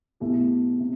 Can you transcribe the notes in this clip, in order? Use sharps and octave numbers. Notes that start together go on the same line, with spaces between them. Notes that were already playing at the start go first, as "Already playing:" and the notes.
B1 B2 A3 E4 G4
C3